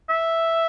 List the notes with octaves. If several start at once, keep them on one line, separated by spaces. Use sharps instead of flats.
E5